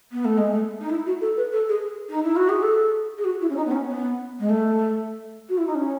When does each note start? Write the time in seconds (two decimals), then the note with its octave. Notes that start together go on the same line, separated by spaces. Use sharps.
0.12 B3
0.25 A3
0.38 G#3
0.51 A3
0.80 D#4
0.90 E4
1.06 F#4
1.21 A4
1.37 B4
1.52 A4
1.69 G#4
2.10 D#4
2.23 E4
2.36 F#4
2.49 G#4
2.63 A4
3.18 G#4
3.25 F#4
3.41 E4
3.50 C#4
3.57 D#4
3.66 B3
3.72 C#4
3.88 B3
4.39 G#3
4.50 A3
5.49 F#4
5.58 E4
5.67 D#4
5.75 C#4